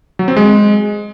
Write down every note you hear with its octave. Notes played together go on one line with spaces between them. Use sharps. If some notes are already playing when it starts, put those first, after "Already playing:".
F#3
C4
G#3